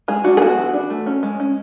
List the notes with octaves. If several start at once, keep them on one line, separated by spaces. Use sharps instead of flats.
G#3 G#4
D4 F#4
G#4
B3 F#4
E3
D4
A3
C#4
G#3
C#4